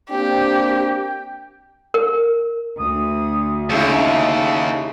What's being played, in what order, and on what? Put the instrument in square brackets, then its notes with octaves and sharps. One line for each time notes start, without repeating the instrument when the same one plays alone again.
[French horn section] A#3 C4 D4 [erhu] G4 [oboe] G5
[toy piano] A#4
[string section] D2 [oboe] D#6
[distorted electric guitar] D#2 [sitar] C#3 G#3 E4 [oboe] A4